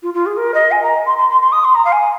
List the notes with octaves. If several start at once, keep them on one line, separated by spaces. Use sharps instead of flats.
F4
F4
G#4
A#4
D#5
G#5
A#5
C6
C6
C6
C6
D#6
C6
A#5
F5
G#5